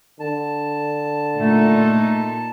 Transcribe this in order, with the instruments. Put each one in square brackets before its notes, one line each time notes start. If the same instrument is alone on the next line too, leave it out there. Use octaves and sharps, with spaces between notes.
[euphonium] D3 [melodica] A5
[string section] A#2 D#4 A4 [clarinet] A3